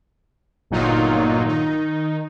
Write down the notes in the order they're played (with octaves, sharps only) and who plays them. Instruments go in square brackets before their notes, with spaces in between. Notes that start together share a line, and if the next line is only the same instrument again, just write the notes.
[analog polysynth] G1 A#2 F#3 D#4 F4
D#3 D#4